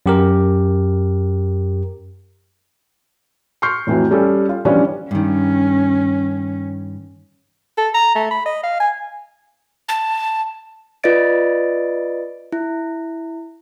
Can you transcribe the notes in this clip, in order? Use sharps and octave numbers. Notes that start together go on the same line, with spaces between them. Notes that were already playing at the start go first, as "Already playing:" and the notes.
F#2 G4 A#4
C6 C#6 F6 G6 C7
F2 A2 E3 F#3
G3 C#4 A4
F4
E3 F3 G3 C#4 D4 F4
G2 D#3 C#4
A4
A#5
A3
B5
D#5
F5
G#5
A5
F4 B4 D5 D#5 A6 D7
E4